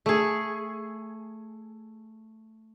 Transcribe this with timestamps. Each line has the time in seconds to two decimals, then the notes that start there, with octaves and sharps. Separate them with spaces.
0.06 A3 G#4